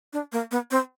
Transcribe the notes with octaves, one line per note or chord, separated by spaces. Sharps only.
D4
A#3
B3
C4